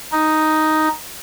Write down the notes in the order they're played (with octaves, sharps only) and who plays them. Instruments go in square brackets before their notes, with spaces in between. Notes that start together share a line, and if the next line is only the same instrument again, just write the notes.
[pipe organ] D#4